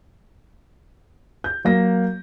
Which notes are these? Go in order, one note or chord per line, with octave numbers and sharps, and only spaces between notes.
G6
F#3 A#3 A#6